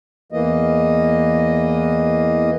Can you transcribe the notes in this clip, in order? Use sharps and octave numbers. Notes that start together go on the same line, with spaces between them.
E2 E3 A#3 D#5